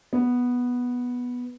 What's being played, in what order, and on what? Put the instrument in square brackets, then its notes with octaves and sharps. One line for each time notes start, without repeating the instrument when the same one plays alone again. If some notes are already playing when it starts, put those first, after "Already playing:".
[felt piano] B3